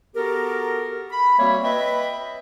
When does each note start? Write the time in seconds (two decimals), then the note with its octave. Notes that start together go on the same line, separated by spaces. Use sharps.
0.16 B3 F#4 G4 A4 A#4
1.11 B5
1.39 G3 A#3 C4 F#4 C#5 E5
1.64 B4 D#5 E5 G5 B5